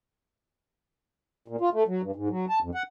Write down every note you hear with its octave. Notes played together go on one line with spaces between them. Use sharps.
A#2
F4
A3
F#3
G2
G#2
F#3
A5
F2
F#5